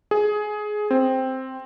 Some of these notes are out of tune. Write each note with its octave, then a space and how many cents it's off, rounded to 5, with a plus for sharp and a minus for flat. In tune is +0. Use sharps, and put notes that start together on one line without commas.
G#4 +15
C4 +0